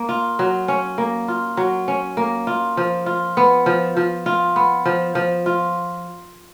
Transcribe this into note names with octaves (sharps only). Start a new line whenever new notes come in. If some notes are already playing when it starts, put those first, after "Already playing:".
Already playing: A#3
F4
F#3
C#4
A#3
F4
F#3
C#4
A#3
F4
F3
F4
B3
F3
F3
F4
B3
F3
F3
F4